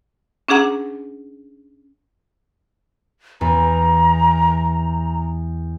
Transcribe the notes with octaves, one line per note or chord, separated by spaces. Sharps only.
C#4 D4 G#4 F#5 A#5
E2 A#5